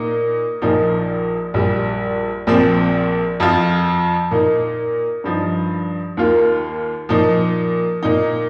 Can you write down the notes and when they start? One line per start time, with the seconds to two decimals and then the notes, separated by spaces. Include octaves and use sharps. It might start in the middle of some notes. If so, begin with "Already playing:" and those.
Already playing: A#2 A#3 D#4
0.62 A#1 A#2 F3 A#3 D#4
1.54 A#1 A#2 G3
2.47 A#1 A#2 F3 C4
3.40 F2 F3 C4 F4
4.31 A#2 A#3 D#4
5.24 G2 F3 D#4
6.17 D#2 D#3 A#3 F4
7.09 A#2 F3 D#4
8.03 A#2 A#3 D#4